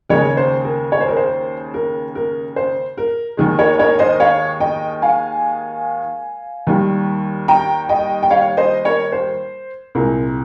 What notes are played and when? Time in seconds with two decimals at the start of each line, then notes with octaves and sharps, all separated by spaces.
0.09 D#2 C#3 G#3 A#4 C#5
0.37 C5
0.64 A#4
0.92 C#5
1.01 C5
1.08 A#4
1.17 C5
1.74 A#4
2.15 A#4
2.56 C5
2.97 A#4
3.37 D#2 D#3 G#3
3.58 A#4 C#5
3.79 A#4 C#5
3.99 C5 D#5
4.20 C#5 F5
4.60 D#5 G5
5.02 F5 G#5
6.67 D#2 D#3 G3
7.48 G5 A#5
7.89 D#5 G5
8.23 G5
8.30 C#5 F5
8.57 C5 D#5
8.85 A#4 C#5
9.12 C5
9.95 C2 A#2 G#3 A#4